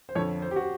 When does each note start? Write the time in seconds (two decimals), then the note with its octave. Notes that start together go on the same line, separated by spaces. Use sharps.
0.09 C5
0.15 F2 D3 F3 C#5
0.42 C5
0.51 G4
0.56 F#4